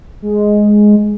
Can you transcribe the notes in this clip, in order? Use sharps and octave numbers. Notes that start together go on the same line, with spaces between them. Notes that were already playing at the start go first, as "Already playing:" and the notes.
G#3